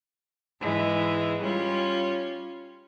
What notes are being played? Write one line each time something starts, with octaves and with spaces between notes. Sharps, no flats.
G#2 E3 G#3
G3 C#4 F4